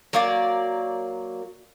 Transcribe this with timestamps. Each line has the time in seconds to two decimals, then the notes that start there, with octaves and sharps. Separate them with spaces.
0.13 F#3 A#3 D5